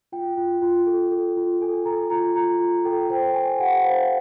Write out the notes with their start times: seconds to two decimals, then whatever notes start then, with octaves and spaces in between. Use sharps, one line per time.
0.12 F4 G5
0.37 F4
0.62 F4
0.86 A4
1.11 A4
1.37 F4
1.61 A4 G#5
1.85 A4 A#5
2.10 F4 A#5
2.36 F4 A#5
2.60 F4
2.85 A4 G5
3.10 C5 G5
3.34 C5 G#5
3.59 G4 F#5
3.84 C5 F5